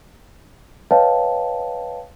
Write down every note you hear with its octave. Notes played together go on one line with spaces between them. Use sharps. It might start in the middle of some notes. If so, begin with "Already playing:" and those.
B4 C#5 D#5 F5 G5 A5